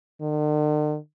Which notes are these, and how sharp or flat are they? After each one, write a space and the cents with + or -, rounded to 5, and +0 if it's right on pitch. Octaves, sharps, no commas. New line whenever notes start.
D3 +45